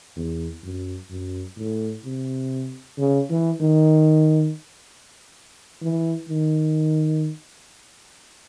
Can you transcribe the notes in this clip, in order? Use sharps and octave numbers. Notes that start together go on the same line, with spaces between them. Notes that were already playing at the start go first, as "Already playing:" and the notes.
E2
F#2
F#2
A2
C3
C#3
E3
D#3
E3
D#3